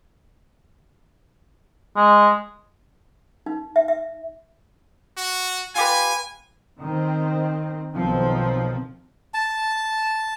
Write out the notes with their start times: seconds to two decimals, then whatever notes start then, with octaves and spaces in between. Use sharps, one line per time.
1.96 G#3
3.46 D#4
3.76 E5
3.88 E5
5.17 F#4
5.75 F4 G4 B4 G#5
6.81 D#3 C4
7.96 B1 D#3 F3 C4
9.34 A5